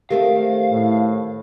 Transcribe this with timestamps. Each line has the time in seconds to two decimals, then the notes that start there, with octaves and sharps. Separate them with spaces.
0.10 D#3 A3 C4 G4 A#4 F5
0.71 A2